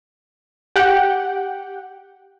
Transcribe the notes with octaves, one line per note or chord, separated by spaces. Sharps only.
G4 F#5 G5